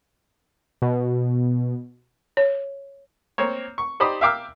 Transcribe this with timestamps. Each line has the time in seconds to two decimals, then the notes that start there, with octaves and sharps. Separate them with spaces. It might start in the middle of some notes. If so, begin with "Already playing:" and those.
0.82 B2
2.37 C#5
3.38 A#3 C4 C#5
3.78 C#6
4.00 D#4 G4 C5 D5 B5 D#6
4.21 E5 F5 G5 D6 E6 F6